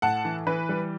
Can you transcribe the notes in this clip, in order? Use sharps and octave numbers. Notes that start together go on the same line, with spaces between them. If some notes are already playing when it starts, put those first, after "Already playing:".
A2 F#5 A5
E3
E3 B4
G3